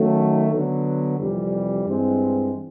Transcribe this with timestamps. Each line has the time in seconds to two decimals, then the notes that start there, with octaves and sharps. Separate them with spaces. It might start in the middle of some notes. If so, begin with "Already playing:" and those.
Already playing: D#3 F#3 A3 C#4
0.52 D3 F#3 B3
1.19 F2 C3 E3 G3
1.86 G2 E3 G#3 C4